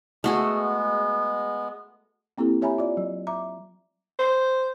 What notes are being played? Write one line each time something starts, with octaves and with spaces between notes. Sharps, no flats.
G#3 A3 B3 F#4 G#4
A#3 C4 E4 G4 A4
G4 C#5 E5 G#5 A#5 B5
F4 D5
F#3
E5 A#5 D6
C5